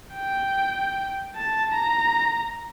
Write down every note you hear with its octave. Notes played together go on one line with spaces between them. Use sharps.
G5
A5
A#5